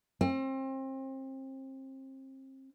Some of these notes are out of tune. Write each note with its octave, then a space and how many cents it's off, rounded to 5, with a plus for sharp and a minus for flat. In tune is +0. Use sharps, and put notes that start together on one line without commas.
C4 +30